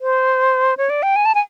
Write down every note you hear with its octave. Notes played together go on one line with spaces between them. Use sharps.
C5
C#5
D5
G5
G#5
A5
G#5